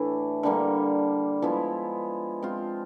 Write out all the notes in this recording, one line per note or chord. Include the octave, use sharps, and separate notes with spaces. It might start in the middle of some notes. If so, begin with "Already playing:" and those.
Already playing: A2 E3 A3 D4
D3 G3 A#3
F3 G#3 B3 E4
G#3 C4 F4